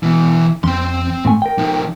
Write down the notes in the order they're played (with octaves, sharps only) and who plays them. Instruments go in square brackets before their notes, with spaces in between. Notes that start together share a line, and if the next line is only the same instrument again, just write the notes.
[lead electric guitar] B2 E3
[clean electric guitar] F2 [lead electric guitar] C4 C6
[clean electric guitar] G#2 A3 G#5
A#4 G5
[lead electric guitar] F3 D#4